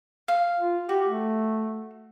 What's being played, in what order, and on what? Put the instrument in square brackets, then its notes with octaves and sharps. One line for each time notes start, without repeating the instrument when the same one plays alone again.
[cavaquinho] F5
[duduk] F4
[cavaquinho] F#4 [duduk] G4
[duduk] A3